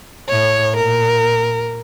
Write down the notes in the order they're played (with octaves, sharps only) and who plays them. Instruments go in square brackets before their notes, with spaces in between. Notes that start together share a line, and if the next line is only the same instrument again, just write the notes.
[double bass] A2 [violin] C#5
[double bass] A#2 [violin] A#4